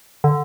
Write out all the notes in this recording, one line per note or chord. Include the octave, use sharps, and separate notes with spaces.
D3